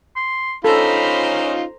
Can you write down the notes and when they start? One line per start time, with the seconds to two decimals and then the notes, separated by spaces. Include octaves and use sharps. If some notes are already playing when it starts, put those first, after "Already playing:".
0.16 C6
0.64 C#4 D#4 F4 A4 C5 A#5 B5